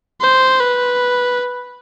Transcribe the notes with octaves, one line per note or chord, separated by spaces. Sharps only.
C5
B4